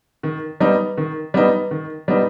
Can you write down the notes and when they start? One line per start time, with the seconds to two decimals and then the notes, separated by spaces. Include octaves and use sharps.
0.23 D#3
0.60 G3 B3 D#4
0.98 D#3
1.34 G3 B3 D#4
1.71 D#3
2.08 G3 B3 D#4